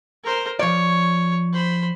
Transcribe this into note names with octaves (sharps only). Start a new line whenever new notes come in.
A#4 C5
F3 C#5 D5
C5 B5